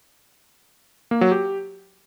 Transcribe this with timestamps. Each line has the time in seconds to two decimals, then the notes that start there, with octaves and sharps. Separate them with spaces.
1.11 A#3
1.21 F#3
1.31 G4